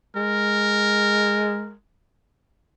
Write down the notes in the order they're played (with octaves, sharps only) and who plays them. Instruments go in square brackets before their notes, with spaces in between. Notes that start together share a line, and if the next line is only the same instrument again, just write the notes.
[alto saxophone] G#3 [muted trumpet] A#4